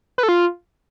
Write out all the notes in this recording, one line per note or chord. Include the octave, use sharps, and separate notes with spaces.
B4
A4
F4